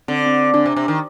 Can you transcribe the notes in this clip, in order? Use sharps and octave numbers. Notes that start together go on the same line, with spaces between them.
D3 C4
C4
D3 D4
C3
C3
D#3